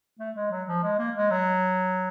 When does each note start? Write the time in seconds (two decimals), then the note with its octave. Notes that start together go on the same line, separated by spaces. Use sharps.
0.19 A3
0.36 G#3
0.51 F#3
0.68 F3
0.83 G#3
0.99 A#3
1.16 G#3
1.31 F#3